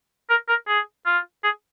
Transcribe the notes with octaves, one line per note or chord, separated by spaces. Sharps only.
A#4
A#4
G#4
F4
G#4